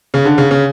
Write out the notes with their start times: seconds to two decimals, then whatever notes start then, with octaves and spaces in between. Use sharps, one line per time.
0.14 C#3
0.25 D3
0.38 C#3
0.51 C#3